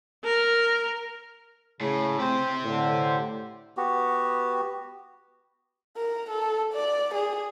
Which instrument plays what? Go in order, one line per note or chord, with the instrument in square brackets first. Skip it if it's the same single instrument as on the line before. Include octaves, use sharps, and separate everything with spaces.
[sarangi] A#4
[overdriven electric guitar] A2 [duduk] C#3
[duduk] C4 [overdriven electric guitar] G4 C5
[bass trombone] A2 [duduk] D3
[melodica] B3 F#4 G4
[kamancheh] A#4
A4
D5
G#4